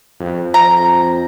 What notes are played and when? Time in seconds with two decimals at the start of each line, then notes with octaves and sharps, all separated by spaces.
0.20 F2
0.54 F2 A#5